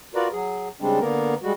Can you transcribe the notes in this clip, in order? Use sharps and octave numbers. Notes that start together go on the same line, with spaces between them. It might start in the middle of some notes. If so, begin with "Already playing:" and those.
F4 F#4 A#4 B4 D5
F#3 G#4
C#3 G3 G#3 C4 D4
D3 A#3 B3 A#4
G3 G#3 F#4